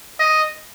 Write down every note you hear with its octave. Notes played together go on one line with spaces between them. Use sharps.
D#5